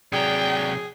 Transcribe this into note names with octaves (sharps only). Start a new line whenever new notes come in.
C3 F#3 G#4 D5 G5